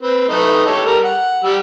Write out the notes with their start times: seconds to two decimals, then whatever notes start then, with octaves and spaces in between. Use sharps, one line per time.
0.01 C4 B4
0.29 A3 D#4 B4
0.66 G4 A4 C#5
0.86 G3 A#4
1.04 F#5
1.44 G3 E6